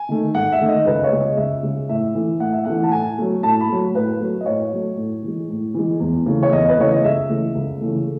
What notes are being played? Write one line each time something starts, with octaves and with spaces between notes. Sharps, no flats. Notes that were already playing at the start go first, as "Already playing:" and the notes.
Already playing: G#5
D#3 A3
G#2 F#5
E5
D#3 A3
D#5
C#2 B4
D#5
C#5
C#3 G#3
D#5
C#2 E5
C#3 G#3
A2 E5
E3 A3
A2 F#5
E5
E3 A3 F#5
A5
A2 G#5
F#3 A3
A2 A5
B5
F#3 A3
A2 B4
F#3 A3
D#5
A2 C#5
F#3 A3
A2
E3 G#3
A2
E3 G#3
E2
C#3 E3 A3
C#5
E2 D#5
B4
C#3 E3 A3 C#5
D#5
C#2 E5
C#3 E3 A3
C#2
C#3 E3 A3